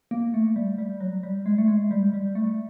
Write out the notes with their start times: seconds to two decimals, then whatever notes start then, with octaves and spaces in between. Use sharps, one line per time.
0.11 A#3
0.34 A3
0.56 G3
0.78 G3
1.00 F#3
1.23 G3
1.46 G#3
1.58 A3
1.68 G#3
1.91 G3
2.14 G3
2.35 A3